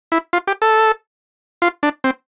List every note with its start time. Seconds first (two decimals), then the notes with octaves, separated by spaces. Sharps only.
0.12 E4
0.33 F4
0.47 G4
0.62 A4
1.62 F4
1.83 D4
2.04 C4